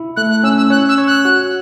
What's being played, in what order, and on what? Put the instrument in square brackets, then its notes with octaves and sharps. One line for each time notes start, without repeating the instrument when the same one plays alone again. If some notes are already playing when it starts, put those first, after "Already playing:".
Already playing: [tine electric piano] E4
[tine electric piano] A3 [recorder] F#6
[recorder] F#6
[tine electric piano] C#4 [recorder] E6
[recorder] E6
[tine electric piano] C#5 [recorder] F#6
[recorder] E6
[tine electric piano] C#5
[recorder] F#6
[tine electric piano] F#4